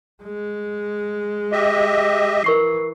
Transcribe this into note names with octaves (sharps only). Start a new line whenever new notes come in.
G#3
G4 D#5 E5
E3 A#4 C#6 C7